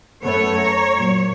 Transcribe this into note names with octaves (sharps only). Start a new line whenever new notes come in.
F#2 A3 B3 C#5
A#5
A#2 F#3